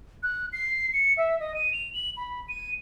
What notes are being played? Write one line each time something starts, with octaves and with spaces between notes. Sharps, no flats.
F#6
C7
C#7
E5
D#5
D#7
F7
F#7
B5
D#7